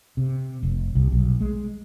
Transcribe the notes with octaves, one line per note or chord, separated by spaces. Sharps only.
C3
F1
C2
B1
G#3